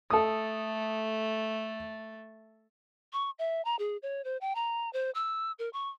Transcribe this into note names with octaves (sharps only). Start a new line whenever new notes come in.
A3 A4 D#6
C#6
E5
A#5
G#4
C#5
C5
G5
A#5
C5
E6
A#4
C#6